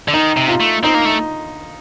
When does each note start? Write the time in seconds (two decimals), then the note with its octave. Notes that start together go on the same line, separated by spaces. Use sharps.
0.08 D3
0.14 D#3 D#4
0.37 C3
0.48 F4
0.60 A3
0.84 C4 D#4
0.95 A#3
1.05 A3